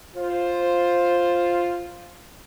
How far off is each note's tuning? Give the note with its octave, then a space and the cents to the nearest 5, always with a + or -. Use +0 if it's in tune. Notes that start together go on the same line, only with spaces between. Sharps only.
F4 +0 C5 +5